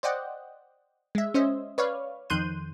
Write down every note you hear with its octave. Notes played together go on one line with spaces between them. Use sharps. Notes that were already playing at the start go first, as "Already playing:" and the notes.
C5 D5 D#5 F#5 G5
G#3 E5
C#4 C5 D#5 E5
B4 C#5 D5 F5
F2 D#3 C6 F#6 G6 D#7